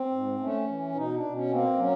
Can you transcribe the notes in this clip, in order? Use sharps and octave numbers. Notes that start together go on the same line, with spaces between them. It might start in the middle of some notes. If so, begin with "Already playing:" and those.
Already playing: C4
G#2
A3 C#4
E3
B2 D#4
D4
B2
C#4
A#3 C4
F#3 C#4